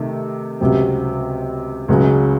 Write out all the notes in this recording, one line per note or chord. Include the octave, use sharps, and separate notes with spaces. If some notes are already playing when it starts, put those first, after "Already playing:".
Already playing: C3 D#3 A3
C#2 C3 F#3 C4
C#2 C#3 F#3 C#4 G#4